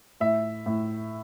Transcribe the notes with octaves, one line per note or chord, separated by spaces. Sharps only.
A2 E5
A2